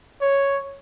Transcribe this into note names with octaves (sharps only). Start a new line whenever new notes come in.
C#5